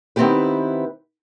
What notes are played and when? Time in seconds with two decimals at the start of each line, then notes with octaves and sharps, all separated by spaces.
0.16 D#3 B3 C4 E4 G4 B4